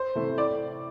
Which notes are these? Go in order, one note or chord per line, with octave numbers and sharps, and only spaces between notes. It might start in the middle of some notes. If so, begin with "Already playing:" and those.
Already playing: C5
C3 E3 A3
A2 D5